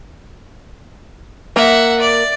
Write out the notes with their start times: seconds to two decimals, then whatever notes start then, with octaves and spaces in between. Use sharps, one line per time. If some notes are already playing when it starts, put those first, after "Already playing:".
1.56 A#3 E5 F#5
2.00 D5